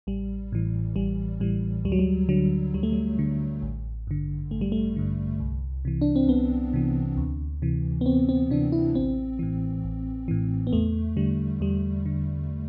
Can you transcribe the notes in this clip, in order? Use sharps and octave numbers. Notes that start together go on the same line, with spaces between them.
A1 G3
A2 E3
A1 G3
A2 E3 G3
D2 G3
F#3
G3
D3 F#3
D2 G3
A3
G3
D3
A1
G2 D3
A1 A3
G3
A3
G2 D3
C2
C3 E3
D4
C4
C2 B3
C3 E3
D2
C3 E3
B3
D2 C4
C4
C3 E3 D4
E4
A1 C4
A2 E3
A1
A2 E3
B3
E2 A3
D3 G3
E2 G3
D3